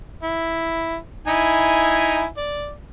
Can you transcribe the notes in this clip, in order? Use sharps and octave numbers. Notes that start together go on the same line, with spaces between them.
E4
D#4 E4 G#5
D5